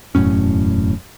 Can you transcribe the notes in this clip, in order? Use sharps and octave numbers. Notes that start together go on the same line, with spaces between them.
E1 F#2 A2 C#4